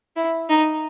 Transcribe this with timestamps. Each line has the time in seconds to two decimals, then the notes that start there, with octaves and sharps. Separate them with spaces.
0.16 E4
0.49 D#4